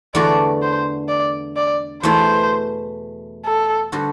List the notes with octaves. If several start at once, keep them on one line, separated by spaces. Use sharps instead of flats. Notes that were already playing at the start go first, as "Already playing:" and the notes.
E2 D3 A3 D4 F#4 D5
C5
D5
D5
E2 B2 A3 E4 C5
A4
D3 G3 C4 F#4